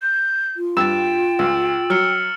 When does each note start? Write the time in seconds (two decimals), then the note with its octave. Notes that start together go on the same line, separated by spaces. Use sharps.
0.01 G6
0.57 F4
0.77 G2 G5 E6 A6 E7
1.39 C#2 E6
1.90 F#3 E6 F6 C#7